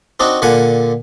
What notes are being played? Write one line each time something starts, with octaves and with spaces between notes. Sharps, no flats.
C4 D4 D#4 F#4
A#2 D3 F#5 G#5